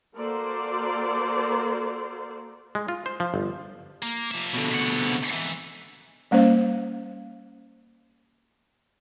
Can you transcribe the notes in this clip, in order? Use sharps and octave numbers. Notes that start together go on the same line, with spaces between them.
A#3 F#4 A4 A#4 C5 D5
G#3
F4
C5
F3
G1
A#3
F3 E5
B2 D3
C3 F#5
G#2 E3
G3 A#3 C#4 C5 F5